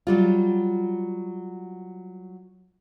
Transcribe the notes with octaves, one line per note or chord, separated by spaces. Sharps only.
F#3 G3 F4